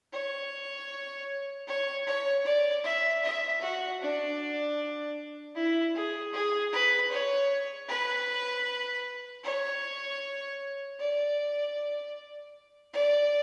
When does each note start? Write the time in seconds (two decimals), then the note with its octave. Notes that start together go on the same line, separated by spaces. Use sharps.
0.12 C#5
1.67 C#5
2.06 C#5
2.45 D5
2.84 E5
3.23 E5
3.61 F#4
4.01 D4
5.55 E4
5.95 G#4
6.33 G#4
6.72 B4
7.11 C#5
7.89 B4
9.43 C#5
11.00 D5
12.93 D5